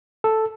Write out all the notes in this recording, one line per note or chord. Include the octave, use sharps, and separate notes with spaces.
A4